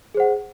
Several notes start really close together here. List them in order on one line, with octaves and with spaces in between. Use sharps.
G#4 C5 F#5